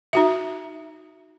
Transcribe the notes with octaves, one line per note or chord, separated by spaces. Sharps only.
D#4 F#4 E5